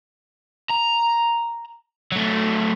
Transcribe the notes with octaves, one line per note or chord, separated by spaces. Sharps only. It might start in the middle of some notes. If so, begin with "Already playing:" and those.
A#5
F#3 A3